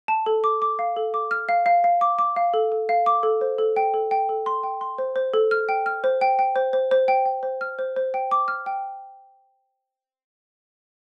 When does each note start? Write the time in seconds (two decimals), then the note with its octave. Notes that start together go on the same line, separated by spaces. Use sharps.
0.08 A5
0.26 A4
0.44 D6
0.62 D6
0.79 F5
0.97 A4
1.14 D6
1.31 F6
1.49 F5
1.66 F5
1.84 F5
2.01 D6
2.19 D6
2.36 F5
2.54 A4
2.72 A4
2.89 F5
3.06 D6
3.23 A4
3.41 C5
3.59 A4
3.76 G5
3.94 A4
4.11 G5
4.29 A4
4.46 C6
4.64 G5
4.81 C6
4.98 C5
5.16 C5
5.34 A4
5.51 F6
5.69 G5
5.86 F6
6.04 C5
6.21 G5
6.39 G5
6.56 C5
6.73 C5
6.91 C5
7.08 G5
7.26 G5
7.43 C5
7.61 F6
7.79 C5
7.96 C5
8.14 G5
8.31 D6
8.48 F6
8.66 G5